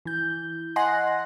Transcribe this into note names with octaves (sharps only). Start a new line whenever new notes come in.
E3 G6
D#5 F#5 G#5 C6 F#6 A#6